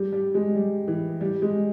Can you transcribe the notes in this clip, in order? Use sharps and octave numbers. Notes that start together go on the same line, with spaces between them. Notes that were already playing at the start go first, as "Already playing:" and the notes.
Already playing: G3
G3
G#3
G3
E3
G3
G#3